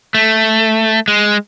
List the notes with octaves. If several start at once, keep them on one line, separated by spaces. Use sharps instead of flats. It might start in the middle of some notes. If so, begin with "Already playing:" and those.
A3
G#3